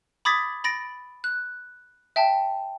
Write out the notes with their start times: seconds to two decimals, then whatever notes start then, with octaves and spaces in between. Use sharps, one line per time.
0.25 B5 D6 D#6 G#6 A6 B6
0.64 B5 A6 A#6 D7
1.24 F#6
2.16 E5 G5 A5